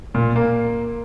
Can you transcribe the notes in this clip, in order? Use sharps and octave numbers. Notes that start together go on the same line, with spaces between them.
A#2
A#3